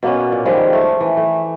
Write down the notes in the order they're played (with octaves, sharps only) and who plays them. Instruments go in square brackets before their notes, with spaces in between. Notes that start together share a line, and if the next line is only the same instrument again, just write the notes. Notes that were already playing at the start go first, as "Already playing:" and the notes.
[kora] B2 A#3 B3 C#4
A#2
D#3 F3 G3 G#3
A3
E3
A3